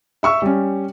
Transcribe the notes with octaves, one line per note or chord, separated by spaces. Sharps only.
E5 C#6 E6
G3 C#4